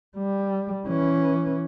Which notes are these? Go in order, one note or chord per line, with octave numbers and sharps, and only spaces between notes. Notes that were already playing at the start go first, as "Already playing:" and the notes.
G3
E3 C#4